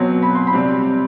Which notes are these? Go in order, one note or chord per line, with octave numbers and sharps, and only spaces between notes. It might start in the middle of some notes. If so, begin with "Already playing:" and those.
Already playing: B2 F#3 C4
B5
C6
B5
C3 G3 C4